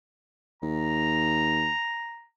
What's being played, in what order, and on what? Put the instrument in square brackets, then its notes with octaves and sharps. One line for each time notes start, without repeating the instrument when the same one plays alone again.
[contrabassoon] D#2 [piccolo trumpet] A#5